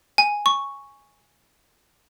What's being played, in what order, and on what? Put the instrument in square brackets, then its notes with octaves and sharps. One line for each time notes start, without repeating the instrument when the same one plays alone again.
[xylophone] G#5
C#6